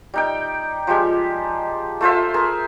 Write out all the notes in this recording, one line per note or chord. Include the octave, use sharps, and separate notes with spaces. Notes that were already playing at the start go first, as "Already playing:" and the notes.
G3 D#4 G5
F3 G3 G#3 G4
A3 F4 C5 E5
G#4 A#4